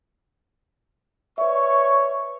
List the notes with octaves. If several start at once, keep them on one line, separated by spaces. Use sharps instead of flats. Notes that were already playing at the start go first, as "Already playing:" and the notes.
B4 C#5 D5 E5 C#6